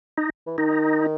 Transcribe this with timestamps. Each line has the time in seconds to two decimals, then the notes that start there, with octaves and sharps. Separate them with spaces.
0.18 D#4
0.47 E3
0.58 D#3 D#4